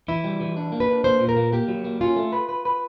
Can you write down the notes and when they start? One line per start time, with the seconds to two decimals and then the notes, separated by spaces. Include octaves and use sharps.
0.08 E3 E4
0.24 G3
0.41 E3
0.56 D4
0.72 A#3
0.80 B4
0.88 D4
1.04 A#3 C5
1.20 A#2
1.29 A#4
1.36 A#3
1.52 A#3 G4
1.68 F#3
1.84 A#3
2.01 C#4 F4
2.16 A3
2.32 B4
2.49 B4
2.65 B4